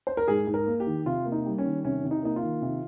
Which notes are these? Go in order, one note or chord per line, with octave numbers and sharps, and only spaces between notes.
C5
A#4
G#2 G#4
G#2
A#4
A#3
G4
D#3
C3 F4
A#3
D#4
G3
C#4
D#3
C3 C#4
C3
D#4
A#3 D#4
F4
D#3
C3